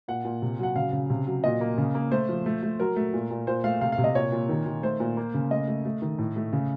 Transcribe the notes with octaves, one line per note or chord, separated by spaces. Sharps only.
A#2 F#5
A#2
C3
F#3 F#5
C#3 F5
C#3
C3
F#3
A#2 D#5
A#3
C#3
A#3
A3 C5
F3
A3
A3
F#3 A#4
A3
A#2
A#2
A#2 C5
A3 F5
C3 F5
F5
C3
D#5
A#2 C#5
A#2
D#3
D#3
A3 C5
A#2
A#3
C#3
A3 D#5
A3
A3
D#3
A2
A3
C#3